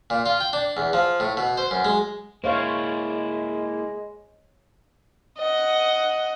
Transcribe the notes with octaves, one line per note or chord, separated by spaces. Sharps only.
A#2
F4
G5
D4
E2
F3
A2
B2
C5
F#2
G#3
G#3 A#3 E4 C5 C#5 F5
D#5 F#5